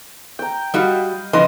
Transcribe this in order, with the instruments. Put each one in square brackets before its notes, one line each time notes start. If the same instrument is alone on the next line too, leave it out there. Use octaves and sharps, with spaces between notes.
[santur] G5 A#5
[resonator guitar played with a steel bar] G3 F#4 [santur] D#5 F5 B5
[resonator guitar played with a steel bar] C#3 F3 D#5 [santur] B4 C6